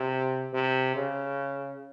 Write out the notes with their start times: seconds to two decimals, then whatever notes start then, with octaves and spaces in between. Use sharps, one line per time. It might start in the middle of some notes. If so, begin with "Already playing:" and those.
Already playing: C3
0.53 C3
0.95 C#3